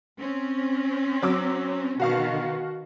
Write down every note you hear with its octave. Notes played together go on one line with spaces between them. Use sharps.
C4 C#4
F#3 D6 E6
B2 D#3 F#4 F5 C#6